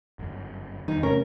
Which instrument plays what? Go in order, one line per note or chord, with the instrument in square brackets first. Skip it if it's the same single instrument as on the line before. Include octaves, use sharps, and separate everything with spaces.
[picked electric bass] G1 F#2
[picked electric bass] E2 G2 [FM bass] D#3 [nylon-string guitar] D#4
[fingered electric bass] C3 A3 [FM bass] C#4 [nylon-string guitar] A#4